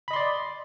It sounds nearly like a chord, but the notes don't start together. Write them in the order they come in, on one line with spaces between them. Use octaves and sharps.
B5 D#5 C6 D5